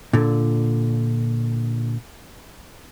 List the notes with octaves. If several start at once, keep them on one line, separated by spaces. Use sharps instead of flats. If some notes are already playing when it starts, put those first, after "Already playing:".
A#2 D3